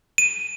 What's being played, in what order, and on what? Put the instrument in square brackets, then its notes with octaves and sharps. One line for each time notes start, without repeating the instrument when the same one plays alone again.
[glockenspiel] D#7